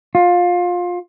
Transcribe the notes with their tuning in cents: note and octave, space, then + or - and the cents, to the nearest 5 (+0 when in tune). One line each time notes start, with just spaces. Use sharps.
F4 +20